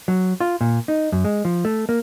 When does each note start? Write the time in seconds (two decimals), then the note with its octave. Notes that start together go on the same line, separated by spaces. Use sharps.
0.08 F#3
0.40 F4
0.61 A#2
0.88 D#4
1.12 F#2
1.25 G#3
1.45 F3
1.65 A3
1.89 A#3